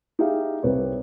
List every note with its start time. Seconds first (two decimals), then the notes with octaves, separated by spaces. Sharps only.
0.19 D#4 G4 G#4 E5 F5 G5
0.62 C2 C3 B4 C#5